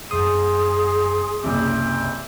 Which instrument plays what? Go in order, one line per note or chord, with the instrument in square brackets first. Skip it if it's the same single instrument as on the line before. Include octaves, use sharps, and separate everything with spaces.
[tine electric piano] F#2 D#6 [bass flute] G#4 [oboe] C6
[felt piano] F#1 C2 [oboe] C4 [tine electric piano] D6